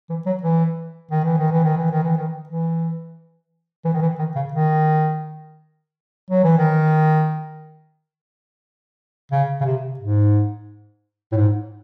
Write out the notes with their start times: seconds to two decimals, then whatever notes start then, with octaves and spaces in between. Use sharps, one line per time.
0.10 E3
0.26 F#3
0.43 E3
1.11 D#3
1.25 E3
1.38 D#3
1.52 E3
1.64 D#3
1.77 E3
1.91 D#3
2.03 E3
2.17 D#3
2.49 E3
3.85 E3
3.93 D#3
4.02 E3
4.19 D#3
4.35 C#3
4.53 D#3
6.30 F#3
6.44 E3
6.58 D#3
9.32 C#3
9.61 C#3
9.65 C3
9.99 G#2
11.32 A2
11.36 G#2